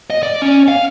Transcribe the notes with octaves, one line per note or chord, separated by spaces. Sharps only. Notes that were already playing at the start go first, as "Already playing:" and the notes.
D#5
D5
C#4
F5